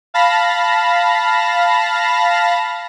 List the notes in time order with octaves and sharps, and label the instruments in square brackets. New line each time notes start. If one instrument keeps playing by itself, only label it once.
[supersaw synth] F5 A5 B5 A#6